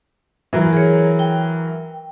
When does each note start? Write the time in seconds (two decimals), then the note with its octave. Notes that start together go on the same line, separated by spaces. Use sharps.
0.53 E3 F#3 A#4
0.73 G#4 C#5
1.19 G5